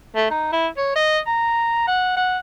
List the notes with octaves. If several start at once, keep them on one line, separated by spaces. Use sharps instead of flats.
A3
D#4
E4
C#5
D#5
A#5
F#5
F#5